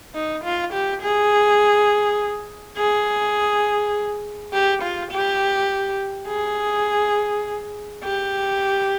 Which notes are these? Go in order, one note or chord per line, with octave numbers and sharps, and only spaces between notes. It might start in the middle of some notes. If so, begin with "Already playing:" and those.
D#4
F4
G4
G#4
G#4
G4
F4
G4
G#4
G4